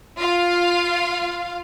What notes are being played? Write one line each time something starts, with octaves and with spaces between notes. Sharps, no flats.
F4 F5